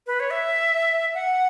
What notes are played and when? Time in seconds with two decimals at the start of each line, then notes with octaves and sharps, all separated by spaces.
0.07 B4
0.20 C#5
0.31 E5
1.14 F#5